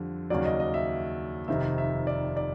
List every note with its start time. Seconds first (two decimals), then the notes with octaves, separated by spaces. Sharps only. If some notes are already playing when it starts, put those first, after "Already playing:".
Already playing: F2 D3 G3
0.30 D#2 C#3 F#3 D5
0.45 D#5
0.60 D#5
0.74 E5
1.48 F1 F2 C3 D#3 E5
1.78 E5
2.07 D5
2.37 D5